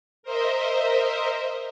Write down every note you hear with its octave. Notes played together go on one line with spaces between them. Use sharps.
A#4 C5 D#5 E5